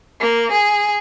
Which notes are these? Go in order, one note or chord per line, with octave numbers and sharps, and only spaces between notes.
A#3
G#4